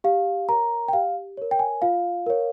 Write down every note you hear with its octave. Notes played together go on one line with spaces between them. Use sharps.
G4 F5
A#4 C#5 A#5
G5
G4 F5
A#4 C#5
G5
G#5
F4 F5
A#4 C#5